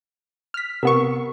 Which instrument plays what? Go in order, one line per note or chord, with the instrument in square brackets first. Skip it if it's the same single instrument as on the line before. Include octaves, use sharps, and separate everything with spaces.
[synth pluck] F6 B6
[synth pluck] C3 B3 C#6 [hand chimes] A#4